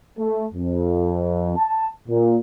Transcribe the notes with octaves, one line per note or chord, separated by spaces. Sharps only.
A3
F2
A5
A#2